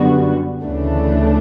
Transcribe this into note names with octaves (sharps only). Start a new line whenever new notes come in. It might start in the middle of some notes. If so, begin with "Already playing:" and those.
Already playing: F#2 D3 G3 B3 F#4
D2 C#3 E3 A3 D4